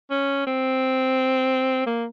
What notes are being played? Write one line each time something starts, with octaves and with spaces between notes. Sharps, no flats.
C#4
C4
A#3